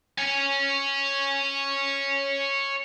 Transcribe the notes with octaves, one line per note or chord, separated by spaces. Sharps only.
C#5 G#5